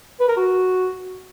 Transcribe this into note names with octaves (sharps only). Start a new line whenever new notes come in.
B4
A#4
F#4